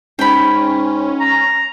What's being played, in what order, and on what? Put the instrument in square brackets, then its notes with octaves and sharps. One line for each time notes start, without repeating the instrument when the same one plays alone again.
[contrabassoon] G#2 [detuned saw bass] C#4 [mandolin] G5 B5
[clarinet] A#5